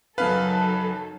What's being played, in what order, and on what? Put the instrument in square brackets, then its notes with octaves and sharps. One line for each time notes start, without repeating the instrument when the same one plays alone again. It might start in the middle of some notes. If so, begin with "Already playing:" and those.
[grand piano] F#2 C#3 F5 [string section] F#3 D#4 A4 [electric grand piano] B4